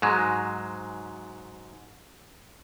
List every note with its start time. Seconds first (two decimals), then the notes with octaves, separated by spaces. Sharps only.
0.02 G#2 F#3 G#3